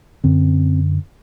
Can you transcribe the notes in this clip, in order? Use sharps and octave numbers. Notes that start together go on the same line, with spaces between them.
F#2 D3 C4